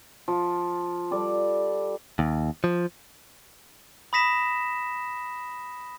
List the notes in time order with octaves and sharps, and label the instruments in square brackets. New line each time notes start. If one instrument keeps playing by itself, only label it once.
[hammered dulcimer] F3
G3 A4 D5
[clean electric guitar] D#2
F3
[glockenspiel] B5 D#6 A#6 B6 E7